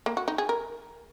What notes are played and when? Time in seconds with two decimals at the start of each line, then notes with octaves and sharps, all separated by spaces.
0.06 A#3
0.17 F#4
0.28 D#4
0.38 G#4
0.49 A#4